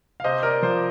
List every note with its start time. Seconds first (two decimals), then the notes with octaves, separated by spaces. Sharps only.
0.20 F5
0.24 C3 C5 D#5
0.43 A#4 D5
0.62 F3 C5